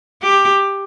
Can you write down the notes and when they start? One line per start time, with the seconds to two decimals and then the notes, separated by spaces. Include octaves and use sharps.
0.23 G4